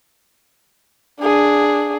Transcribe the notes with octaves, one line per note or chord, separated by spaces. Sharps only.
D4 G#4